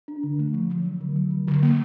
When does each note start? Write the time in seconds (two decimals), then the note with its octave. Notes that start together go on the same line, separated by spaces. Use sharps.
0.08 D4
0.23 D3
0.39 A3
0.54 F3
0.70 F3
0.85 F#3
1.01 D3
1.16 F#3
1.31 D3
1.47 D3
1.63 A#3